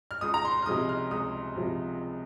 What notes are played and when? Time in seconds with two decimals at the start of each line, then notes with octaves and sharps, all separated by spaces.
0.11 F6
0.21 C#2 D#6
0.34 A#5
0.45 C6
0.62 F6
0.66 C3 F3 G#3 D#6
0.89 F6
1.11 C#2 D#6
1.56 C3 F3 G#3